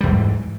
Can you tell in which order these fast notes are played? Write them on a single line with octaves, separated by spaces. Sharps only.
G3 E2 E3 G#2